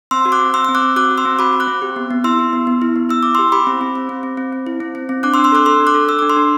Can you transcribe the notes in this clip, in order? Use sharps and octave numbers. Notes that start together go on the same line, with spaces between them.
C4 C6 E6
F#4
D6 F#6
C4
C4 C6 E6
C4 E6
D6 F#6
C4
F#4 D6 F#6
F#4
C6 E6
C4
F#4 B5 D6
F#4
D6 F#6
C4
G4
B3
B3
E4 C6 E6
E4
B3
B3
E4
B3
E4 E6
E4 D6
G4 C6 E6
G4 B5 D6
C4
C4
C4
C4
C4
C4
C4
E4
C4
C4
C4
D4 D6 F#6
C6 E6
D4
C6 E6
A4 D6 F#6
A4 C6 E6
D4
D6 F#6
A4
A4 E6
D4 D6
C6 E6
D4